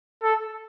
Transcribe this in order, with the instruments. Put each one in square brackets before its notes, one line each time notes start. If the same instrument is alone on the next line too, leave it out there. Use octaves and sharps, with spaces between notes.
[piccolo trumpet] A4